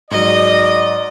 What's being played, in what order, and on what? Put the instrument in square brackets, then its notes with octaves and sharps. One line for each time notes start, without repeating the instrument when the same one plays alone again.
[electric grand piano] G#2 F#3 [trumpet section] D5 [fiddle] D#5